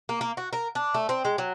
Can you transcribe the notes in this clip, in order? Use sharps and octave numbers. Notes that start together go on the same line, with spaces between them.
A#3
A#3
F#4
A#4
D4
A3
C4
G#3
F#3